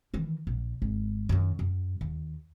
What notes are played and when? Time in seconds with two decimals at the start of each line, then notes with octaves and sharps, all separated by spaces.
0.14 D#3 E3
0.47 A#1
0.82 G#1
1.29 F#2 D#3
1.59 F#2
2.01 D#2